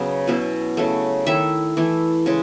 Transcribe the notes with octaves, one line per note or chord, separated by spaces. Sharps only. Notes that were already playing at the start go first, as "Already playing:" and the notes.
Already playing: C#3 F#3 B3
B2 F#3 C#4 E4
C#3 F#3 A3
D#3 A3 E4 E5
E3 A3 E4
C#3 G#3